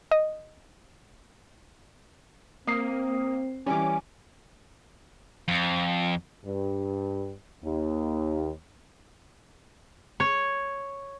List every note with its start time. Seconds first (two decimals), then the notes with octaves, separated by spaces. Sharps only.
0.11 D#5
2.67 A#3 C4 D#6 C7
3.66 E3 G3 C#4 G#5 D6
5.48 F2
6.45 G2
7.63 D#2
10.20 C#5